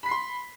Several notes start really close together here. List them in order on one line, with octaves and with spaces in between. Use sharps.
B5 B6 C7 C6